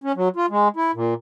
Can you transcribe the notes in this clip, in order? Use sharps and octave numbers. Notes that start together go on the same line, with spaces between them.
C#4
F#3
F4
G#3
E4
A#2